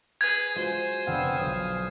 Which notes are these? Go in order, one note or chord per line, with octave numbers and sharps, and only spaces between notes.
G#4 B4 G#6
G#3 F4 F#4 C5 G#5
F1 D3 B3 C4 F5
B1 F5 D#6